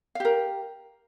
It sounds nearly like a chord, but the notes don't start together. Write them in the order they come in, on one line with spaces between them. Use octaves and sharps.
F5 G4 A#4